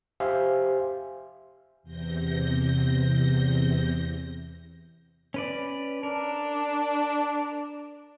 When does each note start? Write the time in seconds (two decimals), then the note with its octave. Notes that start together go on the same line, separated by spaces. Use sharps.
0.20 G4 C5 E5 F5 G#5
1.83 E2 C3 G6 A#6
5.34 C#4 B4 D5
6.03 D4 A#4